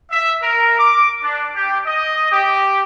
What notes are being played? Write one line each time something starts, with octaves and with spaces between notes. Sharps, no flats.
E5
A#4
D6
D4
G4
D#5
G4